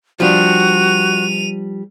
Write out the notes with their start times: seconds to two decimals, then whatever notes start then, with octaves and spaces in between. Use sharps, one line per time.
0.20 F3 G3 D4 F#4 D#7 F7